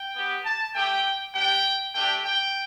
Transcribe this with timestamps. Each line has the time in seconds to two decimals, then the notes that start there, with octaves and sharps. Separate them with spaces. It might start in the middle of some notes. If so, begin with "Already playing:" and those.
Already playing: G5
0.15 B3 G4
0.45 A5
0.75 A3 G4 G5
1.35 G3 D4 G4 G5
1.94 A3 D4 G4 G5
2.24 G5